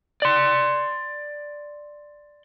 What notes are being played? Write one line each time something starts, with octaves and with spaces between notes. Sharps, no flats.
D5 C6